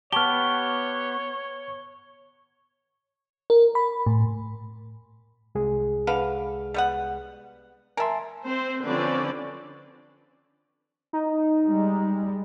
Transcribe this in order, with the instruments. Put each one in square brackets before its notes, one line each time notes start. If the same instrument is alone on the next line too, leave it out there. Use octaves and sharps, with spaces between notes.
[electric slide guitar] B3 G4 [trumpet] C#5 [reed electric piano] A5 C#6 F6 [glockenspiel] G7
[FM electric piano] A#4
B5
A2
[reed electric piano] C2 G#3 G#4
[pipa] D3 B4 F5
G3 B3 F#5
[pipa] A#4 E5 [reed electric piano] G#5 A5 C6
[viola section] C4 C5
D3 F3 C4 C#4 B4 D5
[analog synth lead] D#4
[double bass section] G3 G#3